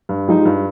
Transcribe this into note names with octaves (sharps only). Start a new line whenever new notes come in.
G2
F3 G#3 D#4 G4
G2